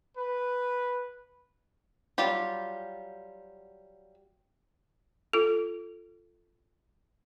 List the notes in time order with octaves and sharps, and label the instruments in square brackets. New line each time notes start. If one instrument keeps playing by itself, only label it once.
[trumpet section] B4
[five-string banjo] F#3 G3 F4 G4
[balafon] F4 A4